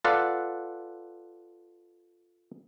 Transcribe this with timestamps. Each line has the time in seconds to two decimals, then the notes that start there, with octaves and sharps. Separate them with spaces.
0.04 F4 A4 B4 D5 F5 F#5